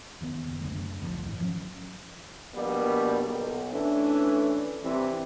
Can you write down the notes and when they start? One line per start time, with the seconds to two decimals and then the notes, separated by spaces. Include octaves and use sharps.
0.21 E1 D#3 B3
0.44 F#1
0.61 F#2 D3 A3
1.01 C2 F2 A2 F3
1.23 G#1 E3
1.40 F3 F#3 C#4
2.54 A#1 B2 G3 A#3
3.22 B1
3.72 E3 A3 C#4 D4
4.84 C3 E3 G3 C4